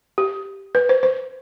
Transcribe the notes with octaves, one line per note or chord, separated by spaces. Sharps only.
G4
B4
C5
C5